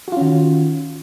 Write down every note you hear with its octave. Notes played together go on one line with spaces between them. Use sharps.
D#3 C#4 F4 F#4